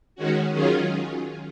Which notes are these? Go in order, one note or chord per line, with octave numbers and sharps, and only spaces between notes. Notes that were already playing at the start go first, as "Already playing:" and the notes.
D#3 G#3 C#4 F#4
D#3 F#3 C#4 F4 G#4